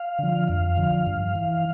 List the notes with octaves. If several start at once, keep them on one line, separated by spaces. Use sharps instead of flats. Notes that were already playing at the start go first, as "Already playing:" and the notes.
Already playing: F5
D3 F3
F2 F5
D3 F3
G2
E3